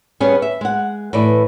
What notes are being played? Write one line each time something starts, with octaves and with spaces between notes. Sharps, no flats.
G3 B3 C#4 G#4
E5
G#3 F#5
A2 E3 B4 D5